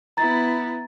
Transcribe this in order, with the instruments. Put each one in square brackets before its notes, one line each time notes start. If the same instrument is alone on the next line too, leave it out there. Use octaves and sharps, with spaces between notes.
[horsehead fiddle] B3 E4 [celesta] A#5 A6